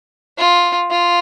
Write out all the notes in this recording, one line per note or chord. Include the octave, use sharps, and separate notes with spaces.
F4
F4